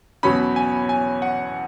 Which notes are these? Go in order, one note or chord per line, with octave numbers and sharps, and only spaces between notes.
E2 B2 F#3 C#4 B5
G#5
G#5
F#5